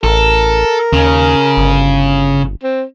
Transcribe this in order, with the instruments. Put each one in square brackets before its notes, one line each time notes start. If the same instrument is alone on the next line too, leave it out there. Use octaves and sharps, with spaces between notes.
[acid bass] A1 [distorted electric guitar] A4 [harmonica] A#4
[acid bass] D#2 [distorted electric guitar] C#3
[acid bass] G1
[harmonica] C4